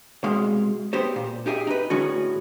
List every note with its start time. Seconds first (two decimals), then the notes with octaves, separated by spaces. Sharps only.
0.24 C2 B2 G#3 F5 C6
0.93 B3 G4 C5
1.16 A#2
1.46 D#4 G4 G#4 E5
1.67 D#4 B4
1.90 A2 D3 C#4 F#4 G#4